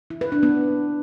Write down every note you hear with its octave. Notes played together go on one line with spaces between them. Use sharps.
E4
B4
D4
B3